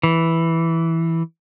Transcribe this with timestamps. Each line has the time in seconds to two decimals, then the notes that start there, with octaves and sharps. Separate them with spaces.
0.03 E3